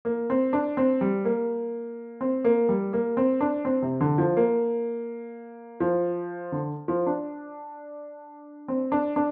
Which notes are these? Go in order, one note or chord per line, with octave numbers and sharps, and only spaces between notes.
A#3
C4
D4
C4
G3
A#3
C4
A#3
G3
A#3
C4
D4
C4
C3
D3
F3
A#3
F3
D3
F3
D4
C4
D4
D4